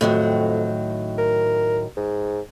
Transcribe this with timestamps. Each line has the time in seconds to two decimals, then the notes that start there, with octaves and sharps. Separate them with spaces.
0.01 F2 A2 D#3 F#3
1.18 A#4
1.96 G#2